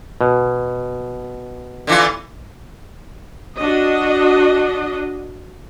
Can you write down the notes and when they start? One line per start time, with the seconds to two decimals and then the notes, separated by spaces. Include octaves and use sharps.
0.21 B2
1.87 D3 E3 F4
3.57 D4 F#4 D#5